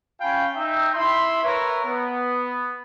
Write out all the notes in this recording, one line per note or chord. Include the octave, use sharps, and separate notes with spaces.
C#4 F4 F5 G5 G#5 B5
D#4 E5 G5
E4 E5 B5 C6
A#4 B4 C#5 E5
B3